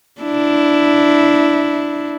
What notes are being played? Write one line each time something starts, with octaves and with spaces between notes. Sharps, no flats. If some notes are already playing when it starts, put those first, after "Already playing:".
D4 E4